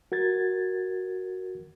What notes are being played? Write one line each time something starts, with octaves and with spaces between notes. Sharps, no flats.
F#4 A#4 G#6 A6